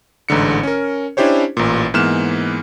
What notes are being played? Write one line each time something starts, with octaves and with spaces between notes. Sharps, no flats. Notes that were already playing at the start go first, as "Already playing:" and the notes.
A1 G#2 D3 C#7
C#4 A#4
C#4 D4 E4 G4 C5 C#5
A1 A#2
G#2 E3 A#3 B3 F6 E7